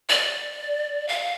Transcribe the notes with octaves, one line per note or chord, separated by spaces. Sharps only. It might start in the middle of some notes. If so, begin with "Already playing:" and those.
D5
F5